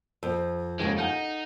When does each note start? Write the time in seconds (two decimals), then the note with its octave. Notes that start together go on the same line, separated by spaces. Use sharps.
0.23 F2 C5 E6
0.79 D#2 G#2 C#3 G#3 C#4 A4 G5 D7
0.98 D#4 D#5 F5 F#5 G#5 G6